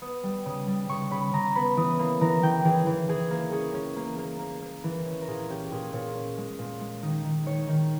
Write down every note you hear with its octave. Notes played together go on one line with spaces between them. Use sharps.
B3 D#6
G3
C#3 D#6
G3
C#3 C#6
C#3 B5
C#3 A#5
B3 B5
E3 D#6
A#3 B5
E3 A#5
E3 G5
E3 G#4
E3
E3 G#4
A#3
C#4 G#4
C#4
A#3
A#3
A#3
A#3
E3
C#4
A#4
A#2 G#4
C#4 G4
A#2 G#4
A#2 C#5
C#4
G#3
A#2
G#3
D#3 D#5
D#3
D#3 C#5
D#3